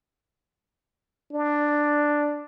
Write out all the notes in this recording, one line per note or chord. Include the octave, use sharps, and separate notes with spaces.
D4